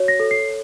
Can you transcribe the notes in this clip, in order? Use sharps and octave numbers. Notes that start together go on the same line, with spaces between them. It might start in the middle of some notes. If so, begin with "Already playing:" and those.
Already playing: F#4 C#5
A#6
A4
C7